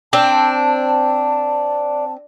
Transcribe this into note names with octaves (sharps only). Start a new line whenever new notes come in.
C4 D4 A5